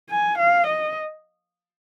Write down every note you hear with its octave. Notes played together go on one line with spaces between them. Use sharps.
G#5
F5
D#5